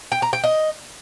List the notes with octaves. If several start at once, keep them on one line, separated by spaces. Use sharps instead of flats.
G5
A#5
G5
D#5